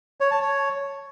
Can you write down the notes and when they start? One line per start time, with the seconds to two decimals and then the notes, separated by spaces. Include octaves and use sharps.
0.21 C#5
0.31 A5
0.42 C#5